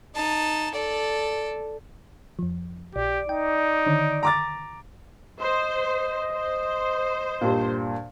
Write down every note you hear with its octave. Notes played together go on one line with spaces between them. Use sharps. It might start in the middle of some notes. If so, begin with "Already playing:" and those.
D#4 A5
A4 D5
F2 F3
A#1 G4 D5
D#4 G5
D3 D#3 C#5
A#5 D6 A6
C5 D#5
C5
G2 A#2